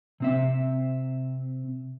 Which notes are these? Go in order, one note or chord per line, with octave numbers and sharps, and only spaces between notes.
C3 C4 E5